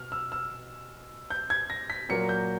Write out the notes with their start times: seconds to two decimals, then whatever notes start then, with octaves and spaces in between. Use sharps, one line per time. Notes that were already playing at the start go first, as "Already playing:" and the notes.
Already playing: B2 F6
0.12 E6
0.32 E6
1.30 G6
1.50 G#6
1.70 A#6
1.90 B6
2.09 A#2 F#3 A#3 C#7
2.29 G6